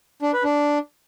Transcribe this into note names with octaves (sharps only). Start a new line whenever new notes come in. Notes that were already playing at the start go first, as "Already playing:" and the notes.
D4
B4
D4